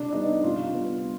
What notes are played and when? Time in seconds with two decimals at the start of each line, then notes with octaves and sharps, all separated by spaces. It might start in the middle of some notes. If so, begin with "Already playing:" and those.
Already playing: C3 D4
0.12 G3 B3 D#4
0.44 C3 F4
0.74 G3 B3